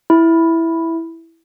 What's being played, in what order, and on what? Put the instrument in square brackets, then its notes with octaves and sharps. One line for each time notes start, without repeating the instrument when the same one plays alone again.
[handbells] E4